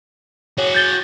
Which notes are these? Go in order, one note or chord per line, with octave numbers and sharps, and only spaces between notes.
F#4 G#4 C#5
G6 A6 G7